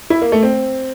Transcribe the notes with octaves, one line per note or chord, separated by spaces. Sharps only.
E4
A#3
A3
C4